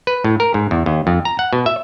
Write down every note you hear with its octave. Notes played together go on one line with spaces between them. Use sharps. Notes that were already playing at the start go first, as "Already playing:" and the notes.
B4
A2
A#4
G#2
E2
D#2
F2
A#5
F#5
B2
E5